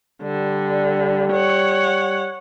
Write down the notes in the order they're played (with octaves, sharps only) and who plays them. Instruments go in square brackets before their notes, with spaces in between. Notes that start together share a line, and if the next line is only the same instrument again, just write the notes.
[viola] D3 [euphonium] G3
[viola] C#5 F#5